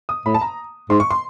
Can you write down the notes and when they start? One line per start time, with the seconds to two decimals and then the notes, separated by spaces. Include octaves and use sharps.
0.09 D#6
0.26 A2 B5
0.34 A5
0.41 A#5
0.90 G#2 C6
1.00 C#6
1.11 C6